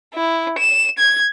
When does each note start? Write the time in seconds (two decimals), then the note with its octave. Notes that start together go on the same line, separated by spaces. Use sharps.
0.14 E4
0.59 E7
0.98 G#6